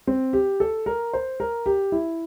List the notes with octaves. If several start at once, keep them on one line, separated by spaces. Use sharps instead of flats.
C4
G4
A4
A#4
C5
A#4
G4
E4